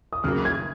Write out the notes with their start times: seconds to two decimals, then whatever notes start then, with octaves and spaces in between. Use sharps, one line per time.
0.13 D#6
0.24 D#2 C#3 F#3 A#3 F6
0.45 G#6